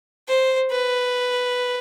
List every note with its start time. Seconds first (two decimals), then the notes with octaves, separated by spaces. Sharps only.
0.28 C5
0.71 B4